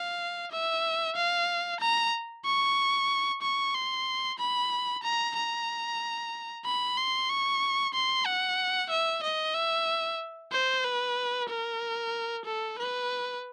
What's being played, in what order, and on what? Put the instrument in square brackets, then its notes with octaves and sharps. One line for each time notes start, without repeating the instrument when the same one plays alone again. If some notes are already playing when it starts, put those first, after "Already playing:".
Already playing: [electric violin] F5
E5
F5
A#5
C#6
C#6
C6
B5
A#5
A#5
B5
C6
C#6
C6
F#5
E5
D#5
E5
C5
B4
A#4
A4
B4